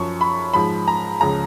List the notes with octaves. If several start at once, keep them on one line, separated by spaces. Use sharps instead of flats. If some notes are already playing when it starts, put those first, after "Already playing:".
Already playing: F#2 F3 C#6
B5
G#2 F3 B5
A#5
C#2 C#3 F3 A#5